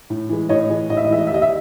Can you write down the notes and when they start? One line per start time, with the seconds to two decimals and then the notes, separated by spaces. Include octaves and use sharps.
0.10 A2
0.29 E3 G#3
0.49 A2 C#5 D#5
0.70 E3 G#3
0.89 A2 D#5
0.97 E5
1.04 D#5
1.10 E3 G#3 E5
1.19 D#5
1.27 E5
1.30 D#2 D#5
1.42 E5